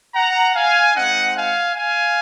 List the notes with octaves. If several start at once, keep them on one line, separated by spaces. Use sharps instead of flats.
F#5 A#5
F5 G#5
G#3 C4 D#4 D#5 F#5
F5 G#5
F5 G#5